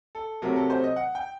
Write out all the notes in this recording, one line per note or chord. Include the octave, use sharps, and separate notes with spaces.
A4
C3 F#3 A3 A#4
A4
C5
D#5
F#5
G5